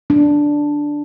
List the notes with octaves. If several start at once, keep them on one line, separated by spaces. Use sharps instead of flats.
D4